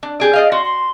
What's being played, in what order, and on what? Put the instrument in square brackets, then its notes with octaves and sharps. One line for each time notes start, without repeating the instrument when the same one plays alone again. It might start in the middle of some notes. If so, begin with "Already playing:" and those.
[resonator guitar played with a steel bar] D4
G4 G#4 D5
[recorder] G#4 [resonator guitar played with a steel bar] D5 D#5 F5
[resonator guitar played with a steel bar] F#4 [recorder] C6
[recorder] C6